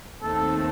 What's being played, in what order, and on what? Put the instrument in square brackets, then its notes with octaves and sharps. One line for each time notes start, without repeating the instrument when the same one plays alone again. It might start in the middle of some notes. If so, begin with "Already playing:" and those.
[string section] D#2 D#3 A3 C4 [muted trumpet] A4